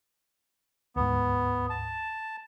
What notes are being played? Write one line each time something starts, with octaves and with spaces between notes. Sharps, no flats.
D2 G#2 B3
A5